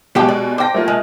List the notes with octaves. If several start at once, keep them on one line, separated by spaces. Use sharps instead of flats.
B2 F3 G#3 G4 G5
D5
C5 G5 D6 A#6
A3 A#3 F4
G#3